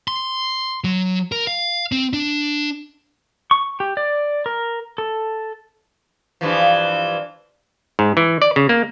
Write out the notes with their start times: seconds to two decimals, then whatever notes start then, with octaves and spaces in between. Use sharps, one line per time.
0.08 C6
0.84 F#3
1.32 A#4
1.47 F5
1.92 C4
2.13 D4
3.51 C#6
3.80 G4
3.97 D5
4.46 A#4
4.98 A4
6.41 G2 E3 F3
7.99 G#2
8.17 E3
8.42 D5
8.56 C#3
8.69 A#3